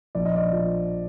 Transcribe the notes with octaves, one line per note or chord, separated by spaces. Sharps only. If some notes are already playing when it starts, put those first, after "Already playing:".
A#1 D5
D#5
D5
F3